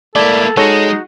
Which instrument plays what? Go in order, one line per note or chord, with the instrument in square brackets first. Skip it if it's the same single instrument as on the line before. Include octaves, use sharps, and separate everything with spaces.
[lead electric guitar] A3 A#3 [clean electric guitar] E4 [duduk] A4 [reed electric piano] D5
[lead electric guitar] G#3 [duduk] D#4 [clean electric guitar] F#4 F#5 [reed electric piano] A4 C#5